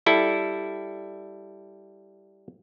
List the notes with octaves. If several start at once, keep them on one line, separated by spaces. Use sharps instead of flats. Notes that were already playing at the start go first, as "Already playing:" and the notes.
G3 E4 A4